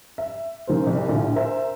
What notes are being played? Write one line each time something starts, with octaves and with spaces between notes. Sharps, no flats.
E5
C#3 A#3 C5
C2
A#1 A2 D3 F4
A#4 C5 E5